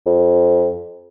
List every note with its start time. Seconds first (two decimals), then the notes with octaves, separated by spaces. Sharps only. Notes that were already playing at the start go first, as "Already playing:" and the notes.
0.06 F2